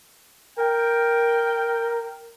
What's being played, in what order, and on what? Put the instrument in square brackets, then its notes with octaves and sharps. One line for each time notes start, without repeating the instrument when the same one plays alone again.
[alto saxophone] A#4 [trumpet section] G5